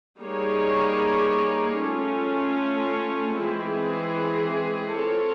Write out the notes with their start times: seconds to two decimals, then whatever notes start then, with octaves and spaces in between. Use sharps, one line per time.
0.19 G3 A#3 D#4 G#4 C#5
1.79 A3 C#4 F4
3.40 E3 G#3 C4 E4 G#4
4.99 C4 F4 A4 C#5